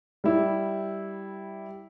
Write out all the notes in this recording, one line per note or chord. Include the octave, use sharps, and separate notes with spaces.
G3 E4